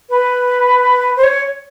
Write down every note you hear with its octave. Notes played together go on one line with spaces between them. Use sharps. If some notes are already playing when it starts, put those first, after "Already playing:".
B4
C5
C#5